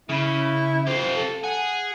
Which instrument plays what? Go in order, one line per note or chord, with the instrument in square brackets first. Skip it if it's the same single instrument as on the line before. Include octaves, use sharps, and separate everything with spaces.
[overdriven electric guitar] C#3 [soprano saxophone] E4
[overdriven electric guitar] F4 G4 [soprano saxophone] C5
[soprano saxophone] A4
[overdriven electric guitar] G#4 [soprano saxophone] F#5